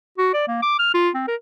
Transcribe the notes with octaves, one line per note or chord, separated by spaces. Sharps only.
F#4
D5
A#3
D6
F6
F4
C4
A#4